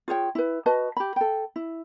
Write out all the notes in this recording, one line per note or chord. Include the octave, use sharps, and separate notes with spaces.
F4 G#4 C#5 G5
E4 B4
F#4 B4 D#5 A5
G4 B5
A4 G5
E4